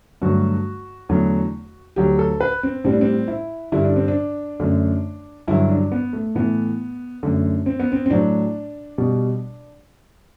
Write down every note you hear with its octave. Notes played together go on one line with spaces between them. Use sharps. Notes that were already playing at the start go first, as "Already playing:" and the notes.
G2 D3 F#3 A3 F#4
E2 D3 F#3 A3
D2 D3 F#3 G4
A4
B4
C4
A2 G3 C4
D4
C4
E4
G2 D3 G3 E4
D4
C4
D4
F#2 D3 A3
G2 D3 F#3 E4
D4
B3
A3
A2 E3 A3 B3
F#2 D3 A3
C4
B3
C4
C4
A2 F#3 A3 D4
B2 G3